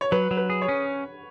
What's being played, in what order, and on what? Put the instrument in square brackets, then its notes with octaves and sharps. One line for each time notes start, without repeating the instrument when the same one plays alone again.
[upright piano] C#5
[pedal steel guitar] F#3 [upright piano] B4
[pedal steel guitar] F#3
[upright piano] B4
[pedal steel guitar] G#4
[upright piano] C#5
[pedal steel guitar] C#4